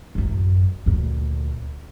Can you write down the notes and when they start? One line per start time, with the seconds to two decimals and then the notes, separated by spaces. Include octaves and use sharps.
0.15 A1 F#2
0.86 D2 A#2